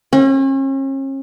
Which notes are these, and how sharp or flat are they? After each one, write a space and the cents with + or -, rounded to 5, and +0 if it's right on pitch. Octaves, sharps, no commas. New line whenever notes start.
C#4 -40